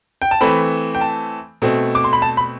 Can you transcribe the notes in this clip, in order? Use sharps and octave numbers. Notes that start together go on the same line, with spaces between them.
G5
A5
E3 A3 C4 B5
G5
A5
B2 A3 C4
D6
C6
B5
A5
B5